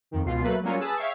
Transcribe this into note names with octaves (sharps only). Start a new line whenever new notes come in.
F2 D#3
C#2 B2 F4 C7
F#3 A3 A#3 B4
F#3 G3 A#3 C#4 F4 C#5
G#4 B4 A5 D#6 E6
C#5 E5 F5 G5 C#6